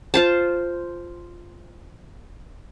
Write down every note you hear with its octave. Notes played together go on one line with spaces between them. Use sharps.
F4 C5 A5